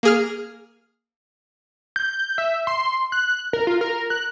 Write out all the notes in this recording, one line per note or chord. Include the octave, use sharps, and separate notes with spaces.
A#3 G#4 F6
G6
E5
C6
F#6
A#4
F4
A#4
F#6